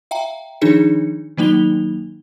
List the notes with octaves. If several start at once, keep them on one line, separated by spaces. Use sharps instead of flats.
E5 F5 G5 A#5
D#3 F3 D4 D#4 G#4 C#7
D#3 F#3 A#3 D#4 F7 G7